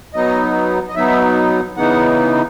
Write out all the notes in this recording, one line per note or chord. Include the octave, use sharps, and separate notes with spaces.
F#3 B3 D#4 D#5
D#5
F#3 B3 D#4 E5
C#3 E3 B3 D#4 F#5